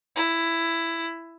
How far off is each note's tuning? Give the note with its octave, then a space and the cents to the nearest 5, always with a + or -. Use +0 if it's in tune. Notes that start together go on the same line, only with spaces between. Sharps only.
E4 +10